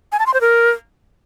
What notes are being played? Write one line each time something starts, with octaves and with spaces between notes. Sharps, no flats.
G#5
A5
C6
C5
A#4